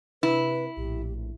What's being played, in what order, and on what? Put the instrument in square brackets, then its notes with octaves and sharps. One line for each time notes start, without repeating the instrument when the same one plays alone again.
[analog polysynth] C3 [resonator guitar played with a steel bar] E4 [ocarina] B4
[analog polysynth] A#1 A2 [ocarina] G4